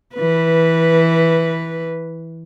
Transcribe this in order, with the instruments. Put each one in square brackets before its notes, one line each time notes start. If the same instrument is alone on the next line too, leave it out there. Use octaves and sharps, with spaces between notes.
[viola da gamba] E3 B4